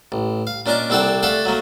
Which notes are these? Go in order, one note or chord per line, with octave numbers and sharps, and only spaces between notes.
A1
F5
A#2 C#4 D4 A#4 D#5 D6
C2 C4 A4 D5 F#5 G5
A3 A4 D5 F5 F#5
F#3 A3 A#3